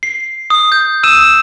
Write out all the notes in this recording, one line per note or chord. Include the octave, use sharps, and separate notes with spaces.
C7
D#6
G6
D#6 E6 D#7 E7